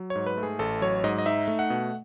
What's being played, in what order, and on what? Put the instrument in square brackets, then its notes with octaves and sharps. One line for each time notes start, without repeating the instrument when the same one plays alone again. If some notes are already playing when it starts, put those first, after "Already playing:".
Already playing: [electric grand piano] F#3
C#5
G#2
B4
A3
G#4
A1 A4
F#3 C#5
G#2 D#5
D#5
D#4 E5
A3
F#5
B2